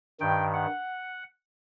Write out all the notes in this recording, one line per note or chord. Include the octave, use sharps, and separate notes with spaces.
G2 D#3 G5
F#5